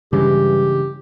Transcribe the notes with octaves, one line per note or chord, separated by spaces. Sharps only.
G2 C#3 E3 G#3 G4